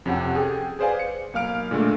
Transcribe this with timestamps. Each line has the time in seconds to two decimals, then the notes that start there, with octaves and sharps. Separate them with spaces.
0.06 F2 C3 C#4 G4 F#5
0.35 G#4 A4 G5
0.79 G#4 B4 C5 D5 F5 G#5
0.99 C#7
1.33 B1 A#3 F5 F6 D7
1.71 A#2 D3 G#3 A3